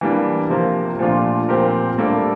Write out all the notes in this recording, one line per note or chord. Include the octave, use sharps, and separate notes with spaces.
E3 G3 A#3 D4
C3 F3 A#3
A#2 F3 A3 D4 F4
A#2 F3 C4 G4 A#4
A2 G3 A#3 D4 A4